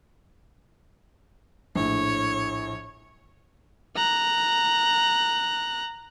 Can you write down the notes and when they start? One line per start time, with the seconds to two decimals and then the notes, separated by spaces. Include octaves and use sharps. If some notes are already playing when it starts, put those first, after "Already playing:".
1.76 A#1 A2 C#5
3.96 A#5 F#6